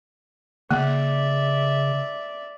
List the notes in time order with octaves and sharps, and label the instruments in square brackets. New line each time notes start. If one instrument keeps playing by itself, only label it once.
[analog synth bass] C#3 [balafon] A#3 [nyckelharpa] D5 E5